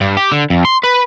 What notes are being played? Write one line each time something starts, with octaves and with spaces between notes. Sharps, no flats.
G2
G4
D3
F2
C6
B4